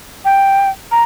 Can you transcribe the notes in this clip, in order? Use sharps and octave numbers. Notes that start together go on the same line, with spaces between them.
G5
A#5